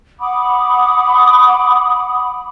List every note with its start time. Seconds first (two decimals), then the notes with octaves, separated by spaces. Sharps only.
0.19 F#5 B5 D6 D#6